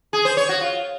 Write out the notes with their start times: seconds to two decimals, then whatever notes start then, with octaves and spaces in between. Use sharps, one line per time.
0.13 G#4
0.25 C5
0.37 C#5
0.49 F#4
0.61 F4